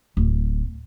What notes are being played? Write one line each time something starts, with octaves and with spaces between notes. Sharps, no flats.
D1